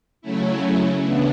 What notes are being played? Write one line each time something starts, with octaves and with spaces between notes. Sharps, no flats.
C#3 F#3 A3 C#4 E4
C#3 E3 B3 D4